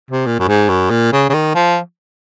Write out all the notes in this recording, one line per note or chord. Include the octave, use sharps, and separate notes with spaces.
C3
A#2
F#2
G#2
F#2
A#2
C#3
C#3
D#3
F3